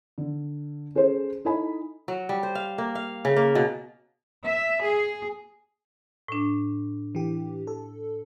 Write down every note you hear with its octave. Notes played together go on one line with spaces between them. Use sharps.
D3
C#4 G#4 A4 C5
D#4 E4 A4 D#5 G#5 B5
F#3
G3
C5
F5
A#3
F5
C#3
A#3
B2
E5
G#4
A2 D4
E3 G4
A4